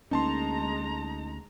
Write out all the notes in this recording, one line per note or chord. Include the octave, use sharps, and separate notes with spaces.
D2 G#3 A#3 C#4 D#4 A5 A#5 C6